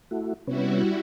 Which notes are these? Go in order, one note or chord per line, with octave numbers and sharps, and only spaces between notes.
A3 E4 F#4
C3 G3 B3 C#4 E4 F#4